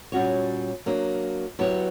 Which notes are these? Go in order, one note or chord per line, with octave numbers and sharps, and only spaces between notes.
A#2 G3 C#4 F#4 C#5
F#3 A#3 D4
F#3 B3 E4 G4 C#5